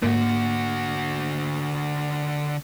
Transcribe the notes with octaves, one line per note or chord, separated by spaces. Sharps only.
G#2 D3 A#3 F#4